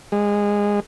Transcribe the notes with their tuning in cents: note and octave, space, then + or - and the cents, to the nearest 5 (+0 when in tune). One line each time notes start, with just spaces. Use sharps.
G#3 -20